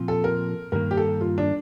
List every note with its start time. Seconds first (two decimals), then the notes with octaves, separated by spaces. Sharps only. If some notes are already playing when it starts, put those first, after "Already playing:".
Already playing: A#2 F3 C4 F4
0.08 A4
0.24 A#4
0.72 G2 D#3 A#3 A#4
0.91 G4
0.97 A4
1.21 F4
1.38 D4